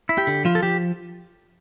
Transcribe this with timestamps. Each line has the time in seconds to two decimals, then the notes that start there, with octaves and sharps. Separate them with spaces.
0.09 E4
0.18 G4
0.27 D3
0.45 F3 F4
0.55 A4
0.62 F3 G4